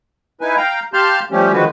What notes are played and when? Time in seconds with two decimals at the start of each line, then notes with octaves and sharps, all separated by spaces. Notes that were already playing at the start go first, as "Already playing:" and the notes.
0.41 D#4 E4 B4 G#5
0.57 F5 G5 A#5
0.93 G4 F5 A5 C6 F6 G6
1.31 F3 G3 A3 C#4 G4
1.52 D3 D#3 F3 G#3 F#4 B4